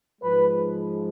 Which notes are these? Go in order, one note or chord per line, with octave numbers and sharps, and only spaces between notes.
G#2 F3 G#3 B4